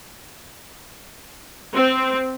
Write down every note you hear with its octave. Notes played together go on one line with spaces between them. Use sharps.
C4